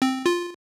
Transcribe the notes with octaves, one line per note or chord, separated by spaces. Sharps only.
C4
F4